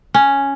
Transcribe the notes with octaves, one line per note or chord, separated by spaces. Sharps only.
C#4